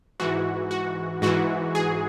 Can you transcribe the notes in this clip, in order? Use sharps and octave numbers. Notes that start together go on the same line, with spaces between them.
G#2 E3 F#4
F#4
G#2 E3 F#4
G#4